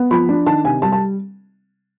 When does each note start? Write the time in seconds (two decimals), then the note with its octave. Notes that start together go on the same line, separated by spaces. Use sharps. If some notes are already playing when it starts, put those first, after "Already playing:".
Already playing: B3
0.11 F3 B5
0.29 D4
0.46 D#3 A5
0.64 C3 G#5
0.82 G3 A5
0.92 A5